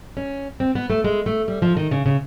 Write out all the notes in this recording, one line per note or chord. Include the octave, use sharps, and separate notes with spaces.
C#4
C4
B3
A3
G#3
A3
G3
F3
D#3
C#3
C#3